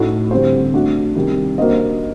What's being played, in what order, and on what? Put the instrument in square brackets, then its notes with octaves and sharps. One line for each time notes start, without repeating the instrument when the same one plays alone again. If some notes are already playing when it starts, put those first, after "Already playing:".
Already playing: [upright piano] A2 A3 D#4 F#4 A4
D3 G3 C4 G4 C5
A3 D4 F#4
C3 D#3 G3 D4 G4
A#3 D4 F#4 C5 D#5